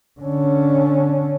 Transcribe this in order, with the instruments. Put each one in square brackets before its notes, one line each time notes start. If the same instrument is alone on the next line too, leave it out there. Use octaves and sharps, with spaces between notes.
[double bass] D3 C#4